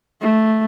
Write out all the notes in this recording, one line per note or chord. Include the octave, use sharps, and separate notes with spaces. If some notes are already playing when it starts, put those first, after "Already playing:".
A3